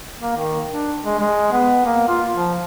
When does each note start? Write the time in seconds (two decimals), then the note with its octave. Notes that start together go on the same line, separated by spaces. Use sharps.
0.20 A#3
0.37 D#3
0.71 D4
1.05 G#3
1.19 G#3
1.52 B3
1.86 A#3
2.08 F4
2.35 F3